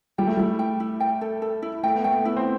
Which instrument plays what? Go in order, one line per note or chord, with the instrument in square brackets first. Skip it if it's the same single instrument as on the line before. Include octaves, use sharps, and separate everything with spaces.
[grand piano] G3 [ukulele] G5
[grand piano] A3
[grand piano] G3 [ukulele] E4
[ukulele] G5
E4
G5
A4
A4
E4
[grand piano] A3 [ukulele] G5
[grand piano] B3
[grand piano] A3 [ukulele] G5
[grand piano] B3 [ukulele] E4
[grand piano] C4